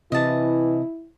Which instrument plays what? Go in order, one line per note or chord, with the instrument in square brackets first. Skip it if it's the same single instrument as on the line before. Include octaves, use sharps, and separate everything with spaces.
[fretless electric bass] C3 [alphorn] E3 [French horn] E4 [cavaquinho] D#5 A5